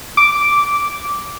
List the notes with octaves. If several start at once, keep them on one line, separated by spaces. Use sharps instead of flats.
D6